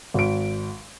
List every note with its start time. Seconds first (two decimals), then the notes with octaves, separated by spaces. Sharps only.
0.14 G#1 D7